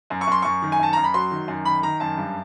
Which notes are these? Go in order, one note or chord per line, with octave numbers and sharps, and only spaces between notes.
F#2
C#6
F#2 C6
F#2 C#6
D#3
G#5
F#2 A5
F#2 A#5
B5
F#3 C6
D#3
F#2
D#3 B5
D#3 A#5
F#2 A5
G2